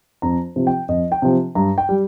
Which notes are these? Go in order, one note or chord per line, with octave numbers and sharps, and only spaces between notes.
F2 A#5
C3 F3
G5
F2 D#5
G5
C3 F3
G2 A#5
G5
G3